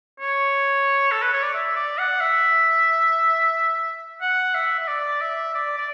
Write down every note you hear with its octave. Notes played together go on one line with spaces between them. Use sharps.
C#5
A4
B4
C#5
D5
E5
D5
F#5
E5
F#5
E5
E5
D5
E5
D5
D5